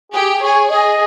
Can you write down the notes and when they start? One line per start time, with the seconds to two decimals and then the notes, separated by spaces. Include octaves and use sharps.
0.11 G4 G#4
0.40 G#4 C#5
0.69 G#4 D#5